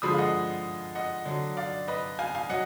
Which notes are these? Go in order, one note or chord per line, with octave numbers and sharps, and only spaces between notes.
D3 F3 G#3 B5 D#6
F5
D#5 F#5
D#5 F#5
D3 F#3
D5 F5
B4 D#5
F5 G#5
F5 G#5
F#3 D#5 F#5